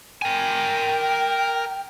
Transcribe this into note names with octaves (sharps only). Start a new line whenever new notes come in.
A#4 G5 G#5